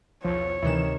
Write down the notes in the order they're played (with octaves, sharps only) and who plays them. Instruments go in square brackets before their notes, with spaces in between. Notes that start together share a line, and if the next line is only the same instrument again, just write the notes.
[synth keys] B1 E2 [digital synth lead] F3 [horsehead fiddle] C#5
[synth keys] D2 G3 E7 [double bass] C3 D#3 [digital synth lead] E3